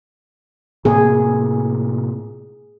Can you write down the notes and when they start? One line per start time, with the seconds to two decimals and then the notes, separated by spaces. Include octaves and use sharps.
0.85 A2 C3 A#3 G#4